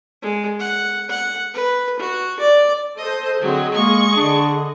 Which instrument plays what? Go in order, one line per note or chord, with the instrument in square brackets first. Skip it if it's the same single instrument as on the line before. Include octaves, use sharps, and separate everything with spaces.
[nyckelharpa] G#3
F#5
F#5
B4
F#4
D5
[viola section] A4 C5 [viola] D#5
[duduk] D3 [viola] F#3 [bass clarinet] C4 [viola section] G#4 D#5
[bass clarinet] G#3 [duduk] A#3 [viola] C#6
[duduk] D3 [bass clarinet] D4